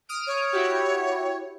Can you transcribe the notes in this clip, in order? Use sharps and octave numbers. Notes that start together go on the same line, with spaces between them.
D#6 F6 D7
C#5
E4 F#4 G4